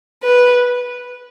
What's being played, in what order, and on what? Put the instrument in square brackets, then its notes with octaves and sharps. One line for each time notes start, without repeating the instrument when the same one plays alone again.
[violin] B4